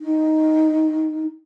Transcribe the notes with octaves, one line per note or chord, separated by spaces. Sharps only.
D#4